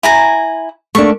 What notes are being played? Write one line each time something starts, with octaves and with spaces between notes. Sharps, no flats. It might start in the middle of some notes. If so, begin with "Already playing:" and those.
E4 G#5 A#5
A3 A#3 D4 C#6